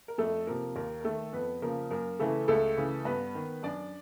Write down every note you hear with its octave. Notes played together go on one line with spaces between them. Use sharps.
A#4
F2 A3 A4
C3 F3 A#3 A#4
D#2 A#3 A#4
A#4
D#3 A3 A4
F2 B3 B4
C#3 F3 A#3 A#4
F#2 A#3 A#4
C#3 E3 A3 A4
C#2 A3 A4
C#3 E3
G2 B3 B4
D#3
F#2 D4 D5